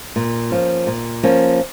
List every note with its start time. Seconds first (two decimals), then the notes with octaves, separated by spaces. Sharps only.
0.16 A#2
0.51 F3 A#3 C#4
0.87 A#2
1.23 F3 A#3 C#4